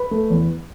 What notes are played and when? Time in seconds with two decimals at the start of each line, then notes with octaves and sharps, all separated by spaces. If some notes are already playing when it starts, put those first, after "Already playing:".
Already playing: B4 B5
0.11 A3
0.30 E2